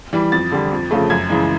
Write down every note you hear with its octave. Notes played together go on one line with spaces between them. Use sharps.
E3 G3
F2 A6
D3 G3
F2
C#3 F3 A3
F#2 G#6
C#3 E3 G#3